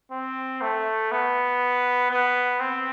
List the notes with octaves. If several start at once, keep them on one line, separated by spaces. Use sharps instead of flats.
C4
A3
B3
B3
C4